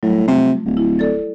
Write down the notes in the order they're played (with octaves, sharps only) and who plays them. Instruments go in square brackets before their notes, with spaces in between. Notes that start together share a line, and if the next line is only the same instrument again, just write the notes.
[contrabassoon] A2 [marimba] F#3 G3
[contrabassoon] C3 [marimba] A3 F4
[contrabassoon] D1
[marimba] E4
A4 D5 A6